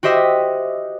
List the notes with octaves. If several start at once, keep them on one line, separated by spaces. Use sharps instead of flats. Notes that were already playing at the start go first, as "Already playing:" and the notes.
F#4 G4 C5 D#5 E5